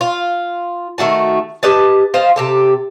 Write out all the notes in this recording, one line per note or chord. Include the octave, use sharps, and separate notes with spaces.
F4
D#3 A3 F#4 A5
G4 B4 D#5 A5
F4 C5 D#5 F5
C3 G4 A4